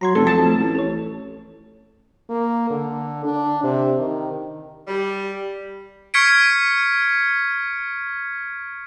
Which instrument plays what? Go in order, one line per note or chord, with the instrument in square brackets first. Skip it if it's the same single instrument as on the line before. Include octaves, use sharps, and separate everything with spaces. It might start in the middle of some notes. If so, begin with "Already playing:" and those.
[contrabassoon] F#3 [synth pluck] A#5 C6 G#6
[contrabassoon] F1 [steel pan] A4
[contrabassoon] F2 [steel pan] A5
[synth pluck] A3
[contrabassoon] A1
[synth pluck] A4 C#5
[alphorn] A#3
D3
D4
C3
D#3
[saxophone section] G3
[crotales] C#6 F6 G#6 B6 C#7 D7